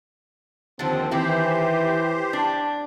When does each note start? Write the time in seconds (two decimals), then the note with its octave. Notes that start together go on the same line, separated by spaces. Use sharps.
0.79 D#2 D3 F3 C4
1.11 D#3 E3 C4 E4 G4 C5
2.33 D4